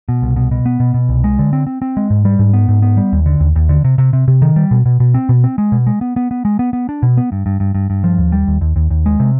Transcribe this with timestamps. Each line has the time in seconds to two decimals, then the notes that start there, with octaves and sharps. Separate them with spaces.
0.09 B2
0.22 C2
0.36 B2
0.51 B2
0.66 B3
0.80 B2
0.94 B2
1.09 C2
1.24 G#3
1.39 D3
1.53 C4
1.67 C4
1.82 C4
1.97 G#3
2.10 G#2
2.25 G3
2.39 G#2
2.53 B3
2.69 G#2
2.82 B3
2.97 G3
3.12 D#2
3.26 D3
3.40 D#2
3.56 D#2
3.69 D3
3.84 C3
3.98 C3
4.13 C3
4.28 C3
4.42 D#3
4.56 G3
4.71 B2
4.85 B2
5.00 B2
5.14 C4
5.29 B2
5.44 C4
5.58 G#3
5.72 B2
5.87 G#3
6.01 B3
6.16 B3
6.31 B3
6.45 G#3
6.59 B3
6.73 B3
6.89 D4
7.03 B2
7.17 B3
7.32 G2
7.46 G2
7.60 G2
7.75 G2
7.90 G2
8.04 F3
8.18 D#2
8.32 G3
8.48 D#2
8.61 D#2
8.76 D#2
8.90 D#2
9.06 G#3
9.20 C3